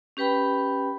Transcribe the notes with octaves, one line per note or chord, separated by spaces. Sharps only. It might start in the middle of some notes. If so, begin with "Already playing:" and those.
C#4 G4 B4 G5 B5